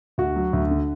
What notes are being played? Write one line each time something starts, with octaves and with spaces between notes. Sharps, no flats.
D2 F#4
F#3
D2
D3